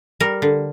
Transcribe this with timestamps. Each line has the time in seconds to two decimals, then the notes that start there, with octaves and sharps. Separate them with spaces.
0.20 G3 A#4
0.42 D3